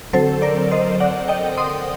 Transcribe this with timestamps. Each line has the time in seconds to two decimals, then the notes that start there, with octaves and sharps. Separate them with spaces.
0.13 D3 F#3 C4 A4 C5
0.42 A#4 D5
0.71 C5 D#5
1.00 D5 F#5
1.29 D#5 G5
1.57 C6 D#6